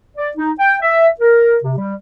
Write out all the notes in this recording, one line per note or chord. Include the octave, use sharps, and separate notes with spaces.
D5
D#4
G5
E5
A#4
C3
G3